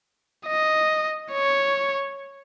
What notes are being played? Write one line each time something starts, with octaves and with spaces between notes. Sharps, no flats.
D#5
C#5